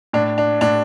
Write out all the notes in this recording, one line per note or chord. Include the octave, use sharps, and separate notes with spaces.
A2 D4
D4
A2 D4